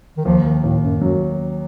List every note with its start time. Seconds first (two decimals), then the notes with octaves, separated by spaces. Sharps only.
0.17 D#3
0.25 D#2 F3
0.44 D#3
0.64 D#2 A2
0.82 F#2
1.01 F#2 F#3